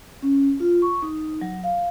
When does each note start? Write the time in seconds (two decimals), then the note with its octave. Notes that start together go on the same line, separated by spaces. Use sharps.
0.22 C#4
0.60 F4
0.82 C#6
1.02 D#4
1.41 F#3
1.64 F5